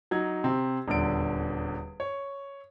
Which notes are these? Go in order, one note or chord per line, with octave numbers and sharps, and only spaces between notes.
F#3 D#4 G#6
C3 C4
D#1 E2 D3 D7
C#5